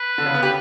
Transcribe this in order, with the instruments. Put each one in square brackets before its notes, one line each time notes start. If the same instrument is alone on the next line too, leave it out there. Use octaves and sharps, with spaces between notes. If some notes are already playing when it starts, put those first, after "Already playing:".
Already playing: [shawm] B4
[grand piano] D3
C#3
B3
[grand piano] G4 [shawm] B4